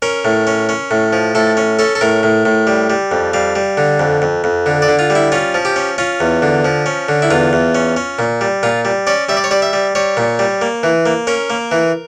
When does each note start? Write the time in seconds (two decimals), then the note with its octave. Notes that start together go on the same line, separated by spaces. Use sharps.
0.02 C#4 A#4
0.25 A2
0.47 C#4
0.69 C#4
0.91 A2
1.13 F3
1.35 A2 A4
1.57 C#4
1.79 C#4 A4
1.95 A4
2.01 A2 A#4
2.23 A2
2.45 A2
2.67 G3
2.90 G3
3.11 F2
3.33 G3 F5
3.55 G3
3.77 D3
4.00 F2
4.22 F2
4.44 F2
4.66 D3
4.82 D5
4.88 D3
4.99 F4
5.10 G3
5.15 E4
5.32 C#4 F4
5.54 F3
5.65 G4
5.76 C#4
5.98 C#4 F4
6.20 E2
6.42 D3
6.65 F3
6.86 C#4
7.08 D3
7.22 E4
7.31 E2 F4
7.53 E2
7.75 C#4
7.96 C#4
8.19 A#2
8.41 G3
8.63 A#2 F4
8.85 G3
9.07 C#4 D5
9.29 G3 E5
9.37 D5
9.44 C#5
9.51 G3 D5
9.62 E5
9.73 G3
9.95 G3 C#5
10.17 A#2
10.39 G3
10.61 A#3
10.83 E3
11.06 A#3
11.27 C#4 A#4
11.50 A#3
11.72 E3